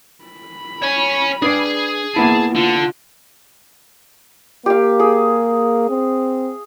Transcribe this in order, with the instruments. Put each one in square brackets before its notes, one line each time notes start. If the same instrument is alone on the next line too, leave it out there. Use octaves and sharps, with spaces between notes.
[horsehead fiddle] B5
[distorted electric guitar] C#5 G#5
[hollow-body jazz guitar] D4 B4 D5 [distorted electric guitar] G#4
[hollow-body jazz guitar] A#3 B3 E4 [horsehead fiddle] A5
[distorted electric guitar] D3 [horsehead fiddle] F4
[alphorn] A#3 [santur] G4 F5
[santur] G#4
[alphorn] C4